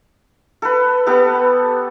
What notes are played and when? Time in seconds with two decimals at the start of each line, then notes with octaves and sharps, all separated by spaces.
0.62 A4 B4
1.07 B3 G4 A4